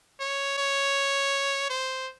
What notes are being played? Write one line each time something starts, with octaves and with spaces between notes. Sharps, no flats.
C#5
C#5
C5